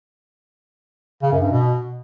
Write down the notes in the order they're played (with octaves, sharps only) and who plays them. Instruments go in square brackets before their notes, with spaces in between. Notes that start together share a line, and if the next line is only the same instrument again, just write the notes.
[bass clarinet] C#3
F#2
G2
B2